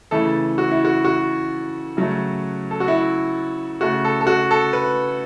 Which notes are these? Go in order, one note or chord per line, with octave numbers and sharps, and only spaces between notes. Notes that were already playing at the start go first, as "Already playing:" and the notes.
C#3 E3 A3 A4
F#4
E4
F#4
F#4
C#3 F#3 A3
A4
F#4
E4
C#3 A3 F#4
A4
A4
F#4
A4
B4